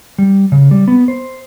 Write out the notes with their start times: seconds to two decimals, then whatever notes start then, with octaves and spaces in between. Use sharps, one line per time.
0.18 G3
0.52 C#3
0.71 G3
0.88 B3
1.08 C5